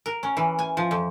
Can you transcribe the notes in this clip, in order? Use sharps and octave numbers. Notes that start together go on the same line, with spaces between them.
A#4
C#4
E3
G#5
F3
F2